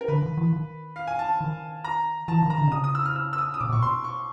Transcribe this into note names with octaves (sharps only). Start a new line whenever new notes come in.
A#4
D3 B4
D#3
E3
D#3
F5
G#5
A5
D#3
A#5
E3 A5
D#3
A#5
D3
C3
C#3 D#6
D#6
E6
F6
E6
E6
D#6
D#6
B2 D6
A#2 C#6
B2 C6
C#6